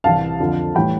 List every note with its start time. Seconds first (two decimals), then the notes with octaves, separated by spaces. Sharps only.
0.04 C2 C3 E3 F5 A5
0.40 F2 D3 F3
0.75 A2 E3 G3 G5 B5